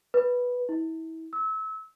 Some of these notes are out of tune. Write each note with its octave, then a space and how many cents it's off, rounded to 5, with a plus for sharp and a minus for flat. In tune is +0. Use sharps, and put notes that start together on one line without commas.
B4 -5
E4 -35
E6 -30